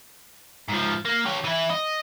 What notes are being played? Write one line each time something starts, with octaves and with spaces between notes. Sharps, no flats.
G#2 F3
A#3
G4 C#5
E3 E4
D#5